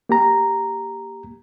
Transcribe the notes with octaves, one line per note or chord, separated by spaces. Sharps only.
A#3 G4 A#5